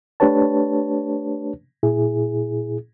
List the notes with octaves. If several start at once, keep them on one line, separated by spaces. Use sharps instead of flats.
A3 D4 G4 B4 C#5 A5
A#2 E4 G#4